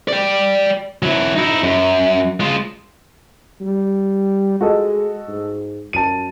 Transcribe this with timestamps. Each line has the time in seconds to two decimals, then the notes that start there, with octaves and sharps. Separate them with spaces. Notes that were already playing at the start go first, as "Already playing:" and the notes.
0.08 D5 G5
1.03 F#3 E4
1.36 D#4 E4
1.63 F#2
2.40 G#3 F4
3.61 G3
4.61 G#3 F#4 A4 D#5
5.28 G#2
5.93 F#2 A5 D#7